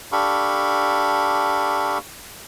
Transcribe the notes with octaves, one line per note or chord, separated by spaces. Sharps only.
D4 G4 A4 F5 B5 C#6